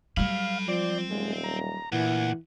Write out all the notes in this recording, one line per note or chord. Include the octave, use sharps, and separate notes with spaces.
F#3 G3 A4 F5 B5
F3 C4 D5
D#1 G#3
A#5
D2 A#2 E3 F#5